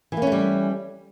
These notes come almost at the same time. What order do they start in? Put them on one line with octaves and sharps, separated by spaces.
E3 A#3 C#4 A3 G3